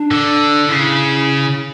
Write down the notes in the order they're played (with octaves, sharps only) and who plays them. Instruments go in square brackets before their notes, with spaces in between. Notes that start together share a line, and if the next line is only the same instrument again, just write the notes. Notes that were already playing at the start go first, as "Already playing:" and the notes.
Already playing: [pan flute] D4
[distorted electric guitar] D3
[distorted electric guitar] C#3 [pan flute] E4